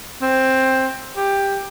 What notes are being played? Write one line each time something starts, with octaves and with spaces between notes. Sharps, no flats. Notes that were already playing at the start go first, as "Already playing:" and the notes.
C4
G4